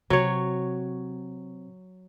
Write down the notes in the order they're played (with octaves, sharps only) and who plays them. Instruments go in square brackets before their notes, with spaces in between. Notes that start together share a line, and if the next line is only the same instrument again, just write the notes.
[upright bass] C3 [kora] F#3 C#5